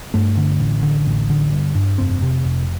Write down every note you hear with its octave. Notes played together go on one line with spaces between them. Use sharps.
G2 A3
D3
A1
D3
A1
D3
G2
G2
F1 C4
C3
F1